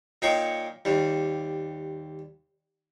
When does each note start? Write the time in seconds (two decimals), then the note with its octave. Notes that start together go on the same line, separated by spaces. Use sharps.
0.22 A#2 A#3 D#4 C#5 G5 C#6
0.85 D#2 G3